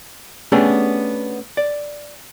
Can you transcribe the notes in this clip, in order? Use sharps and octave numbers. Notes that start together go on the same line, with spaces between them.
A3 B3 C#4 D4 G4 G#4
D5